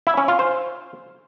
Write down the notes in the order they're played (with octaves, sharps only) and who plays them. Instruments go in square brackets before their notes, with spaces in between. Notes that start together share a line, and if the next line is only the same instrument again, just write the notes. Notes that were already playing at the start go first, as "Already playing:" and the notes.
[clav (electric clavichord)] E4
C#4
F4
C5